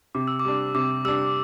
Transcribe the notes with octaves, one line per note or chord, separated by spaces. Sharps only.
C3 D6
E6
D6
G3 D4
C3 D6
G3 D4 E6